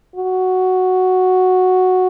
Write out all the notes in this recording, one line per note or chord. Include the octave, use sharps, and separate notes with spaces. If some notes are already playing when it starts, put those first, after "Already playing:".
F#4